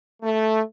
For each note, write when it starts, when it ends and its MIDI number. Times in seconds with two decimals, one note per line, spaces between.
0.23 0.61 57